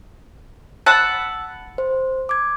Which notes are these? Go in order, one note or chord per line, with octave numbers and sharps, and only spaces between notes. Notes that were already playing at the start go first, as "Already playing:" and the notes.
F#5 A5 B5 E6
C5
D6 G#6